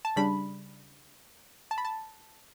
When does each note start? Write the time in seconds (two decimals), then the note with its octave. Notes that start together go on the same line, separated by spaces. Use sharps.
0.05 A5
0.16 C#3 G3 D4 B5
1.71 A5
1.78 B5
1.85 A5